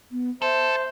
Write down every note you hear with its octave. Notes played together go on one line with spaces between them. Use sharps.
B3
A4 C5 E5